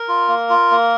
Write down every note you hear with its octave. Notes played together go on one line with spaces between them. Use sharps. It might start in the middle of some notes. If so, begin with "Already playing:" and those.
Already playing: A#4
F4
A#3
F4
A#3